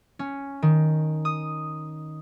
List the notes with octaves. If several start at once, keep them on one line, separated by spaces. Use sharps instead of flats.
C#4
D#3
D#6